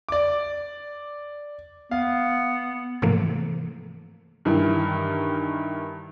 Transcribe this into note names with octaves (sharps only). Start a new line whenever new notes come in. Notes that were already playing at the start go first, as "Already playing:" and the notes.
D5 D6
B3 F5
G#2 C3 E3 F3 A3 A#3
G2 D#3 E3